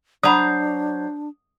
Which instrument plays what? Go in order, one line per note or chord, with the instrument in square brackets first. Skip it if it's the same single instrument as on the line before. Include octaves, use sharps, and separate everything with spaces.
[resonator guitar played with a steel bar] F#3 C5 A#5 [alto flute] D4 [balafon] D5 F#5 B5 [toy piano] D#6